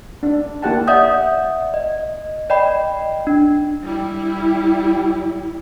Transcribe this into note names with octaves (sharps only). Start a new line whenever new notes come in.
D4
A#3 E4 G4 F#5 G5 A5
D5 E5 F#5 D#6 G6
D#5
D5 D#5 G5 B5
D4
G3 E4